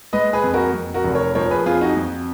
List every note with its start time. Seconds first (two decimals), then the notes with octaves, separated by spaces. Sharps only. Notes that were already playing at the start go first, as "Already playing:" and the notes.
0.13 G#3 B4 D#5
0.33 G#4 B4
0.44 F2
0.54 F#4 A#4
0.74 F2
0.94 F#4 A#4
1.04 F1
1.15 A#4 C#5
1.35 F3 A#4 C#5
1.51 G#4 B4
1.66 F2 F4 G#4
1.81 D#4 F#4
1.96 F2